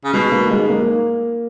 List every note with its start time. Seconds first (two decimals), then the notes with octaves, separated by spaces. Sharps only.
0.04 C#3
0.13 B2 G#3
0.32 A#3
0.50 G#2 G#3
0.70 A#3